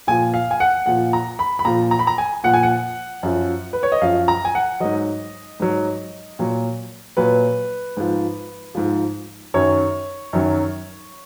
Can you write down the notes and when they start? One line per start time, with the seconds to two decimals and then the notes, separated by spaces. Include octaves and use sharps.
0.07 A#2 F3 G#5
0.34 F5
0.51 G#5
0.60 F#5
0.86 A#2 F3 F#5
1.13 A#5
1.39 B5
1.59 B5
1.65 A#2 F3 A#5
1.91 A#5
1.99 B5
2.07 A#5
2.18 G#5
2.44 A#2 F3 F#5
2.54 G#5
2.63 F#5
3.23 F#2 F3
3.73 B4
3.83 C#5
3.92 D#5
4.01 F#2 F3 F5
4.28 A#5
4.45 G#5
4.55 F#5
4.80 G#2 F#3 D#5
5.60 G#2 F#3
6.39 A#2 F#3
7.17 A#2 F#3 B4
7.97 G#2 F3
8.75 G#2 F3
9.54 F#2 D#3 F#3 C#5
10.33 F#2 D#3 F#3